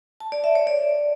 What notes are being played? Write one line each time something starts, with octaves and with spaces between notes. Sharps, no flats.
A5
D5
E5
C#5
D5